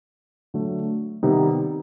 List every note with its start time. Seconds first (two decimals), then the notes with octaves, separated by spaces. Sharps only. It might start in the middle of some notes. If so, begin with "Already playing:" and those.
0.54 D3 F#3 A3
1.23 C3 D#3 G3 B3 D#4